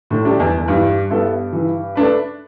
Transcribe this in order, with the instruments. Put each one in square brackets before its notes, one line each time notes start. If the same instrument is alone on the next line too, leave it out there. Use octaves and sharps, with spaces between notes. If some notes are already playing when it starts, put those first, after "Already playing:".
[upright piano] A2 D3
[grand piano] G3 D4 G4
[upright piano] E2
E2
[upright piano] G2 [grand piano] E3
[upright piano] G2 [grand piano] B3 E4 A4
[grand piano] E3
A3 D4 B4